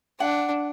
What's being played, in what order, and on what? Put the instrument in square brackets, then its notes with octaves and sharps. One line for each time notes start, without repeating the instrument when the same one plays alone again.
[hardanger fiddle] D4 [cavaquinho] F#5